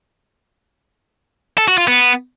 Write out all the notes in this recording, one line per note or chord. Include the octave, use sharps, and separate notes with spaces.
A4
F#4
F4
B3